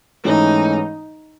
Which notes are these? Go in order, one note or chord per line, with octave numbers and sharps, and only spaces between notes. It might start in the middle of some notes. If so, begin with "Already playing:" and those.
G#2 E3 A3 C#4 D#4